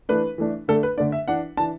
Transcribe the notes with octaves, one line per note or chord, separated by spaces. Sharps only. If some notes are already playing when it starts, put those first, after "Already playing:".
E3 A3 D4 B4
E3 A3 D4
D3 A3 D4 A4
B4
D3 A3 D4 D5
E5
E3 D4 F#5
E3 D4 A5